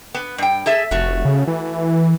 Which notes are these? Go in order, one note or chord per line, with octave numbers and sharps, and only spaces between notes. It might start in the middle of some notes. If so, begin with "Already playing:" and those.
B3
G2 G5
G#4 A4 E5
F1 A3 F#4
C#3
E3